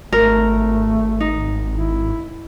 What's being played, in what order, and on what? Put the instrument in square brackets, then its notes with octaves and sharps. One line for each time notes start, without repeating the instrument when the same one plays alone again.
[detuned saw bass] G#1 [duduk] A3 [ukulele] A#4
[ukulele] D#4
[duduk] E4